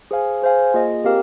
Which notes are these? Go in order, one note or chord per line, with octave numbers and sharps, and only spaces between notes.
G#4 C5 F5 G#5
G#4 C5 F5 G#5
A#3 F4 G#4 D#5
C4 G4 A#4 F5